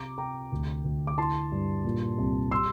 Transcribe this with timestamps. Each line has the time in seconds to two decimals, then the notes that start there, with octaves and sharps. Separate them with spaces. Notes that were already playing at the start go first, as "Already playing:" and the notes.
Already playing: C3 A#5 D6
0.18 C3 G5 A#5
0.52 D2
0.84 D2
1.07 D6
1.18 E4 A5 C6
1.52 G2
1.85 A#2
2.18 C2
2.51 G3 C6 E6